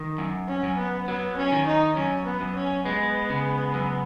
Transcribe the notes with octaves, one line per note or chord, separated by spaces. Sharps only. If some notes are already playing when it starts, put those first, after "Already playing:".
Already playing: D#3
F#2
C#4
F#2
B3
F#3 B3
C#4
D#3
D#4
F#2 C#4
B3
F#2
C#4
G#3 B3
C#3
F#2